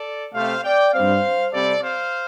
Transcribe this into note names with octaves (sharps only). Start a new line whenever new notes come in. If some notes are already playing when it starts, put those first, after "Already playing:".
Already playing: A4 D5
C3 A3 C4 C5 F5
D5 G5
G2 G3 C4 C5 F5
C3 G3 C4 A4 D5
C5 F5